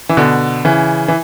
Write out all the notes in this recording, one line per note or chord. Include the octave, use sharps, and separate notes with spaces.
E3
B2 D3
C#3 E3
E3